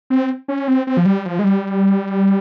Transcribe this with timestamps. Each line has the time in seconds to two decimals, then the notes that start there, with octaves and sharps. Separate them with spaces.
0.10 C4
0.48 C#4
0.68 C4
0.87 C4
0.97 F3
1.06 G3
1.26 F3
1.39 G#3
1.44 G3